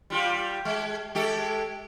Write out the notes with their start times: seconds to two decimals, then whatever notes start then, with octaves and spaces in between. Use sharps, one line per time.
0.10 G3 F4 G4
0.65 G#3
1.15 G#3 G4 A4